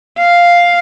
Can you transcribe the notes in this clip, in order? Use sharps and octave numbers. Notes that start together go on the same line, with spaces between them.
F5